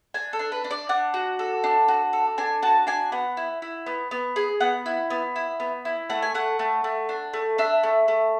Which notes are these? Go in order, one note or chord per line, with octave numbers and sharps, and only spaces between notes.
D4 G#5
A4
D4
B4
D4
D5
D4 F#5
F#4
A4
D4
F#4
A4
D4 G#5
F#4 A5
D4 G#5
B3 F#5
E4
E4
B3
B3
G#4
B3 F#5
E4
B3
E4
B3
E4
A3 F#5
G#5
A3 F#5
A3
A3
D4
A3
D4 E5
A3
A3